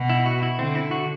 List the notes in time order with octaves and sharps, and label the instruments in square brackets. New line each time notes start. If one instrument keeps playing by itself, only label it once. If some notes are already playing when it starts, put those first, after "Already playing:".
Already playing: [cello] B2
[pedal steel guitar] E4
F#4
E4
[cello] D3 [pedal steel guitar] C4
[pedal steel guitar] E4
F#4